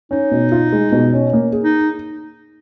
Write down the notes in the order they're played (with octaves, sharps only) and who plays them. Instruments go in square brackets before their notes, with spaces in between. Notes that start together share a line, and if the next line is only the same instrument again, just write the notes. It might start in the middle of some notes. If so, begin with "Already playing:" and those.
[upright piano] C#4 [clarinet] D#4
[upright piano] B2
F4
G#3
B2
C#4
A#3
G#4
[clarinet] D#4